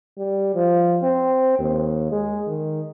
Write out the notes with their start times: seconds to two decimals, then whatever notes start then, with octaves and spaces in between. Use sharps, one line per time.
0.18 G3
0.55 F3
1.03 C4
1.59 D#2
2.12 G#3
2.47 D#3